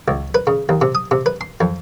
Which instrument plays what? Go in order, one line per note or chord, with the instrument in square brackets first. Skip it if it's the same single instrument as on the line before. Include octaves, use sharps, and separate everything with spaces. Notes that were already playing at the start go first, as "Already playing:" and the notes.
[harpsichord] C#2
B4
C#3
D#2
C3
D#6
C3
B4
C6
F2